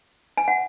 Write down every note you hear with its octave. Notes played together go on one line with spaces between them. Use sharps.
G#5
F#5